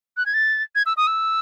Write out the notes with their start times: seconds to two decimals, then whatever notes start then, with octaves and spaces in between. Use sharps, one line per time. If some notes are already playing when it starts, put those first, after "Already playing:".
0.17 F#6
0.26 G#6
0.34 A6
0.75 G#6
0.86 E6
0.97 D#6
1.07 E6